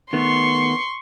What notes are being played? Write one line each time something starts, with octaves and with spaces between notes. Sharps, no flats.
D#3 A3 B3 C6 C#6